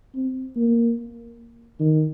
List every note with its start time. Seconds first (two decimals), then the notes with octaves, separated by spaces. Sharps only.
0.15 C4
0.56 A#3
1.80 D#3